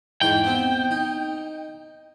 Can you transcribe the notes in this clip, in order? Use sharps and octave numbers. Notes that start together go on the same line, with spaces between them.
E2 G#2 G5 C6
B3 C4
D#4